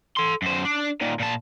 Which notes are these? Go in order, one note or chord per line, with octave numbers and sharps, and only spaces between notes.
A4 C6
F#2 C5
D4
A#2 D#3
A#2 A5